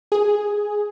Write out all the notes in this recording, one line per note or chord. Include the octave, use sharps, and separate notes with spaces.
G#4